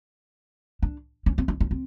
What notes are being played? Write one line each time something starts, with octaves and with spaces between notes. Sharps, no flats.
D4
C#4
C4
D4
C#4
C4